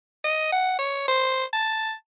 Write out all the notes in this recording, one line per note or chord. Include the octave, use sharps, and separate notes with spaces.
D#5
F#5
C#5
C5
A5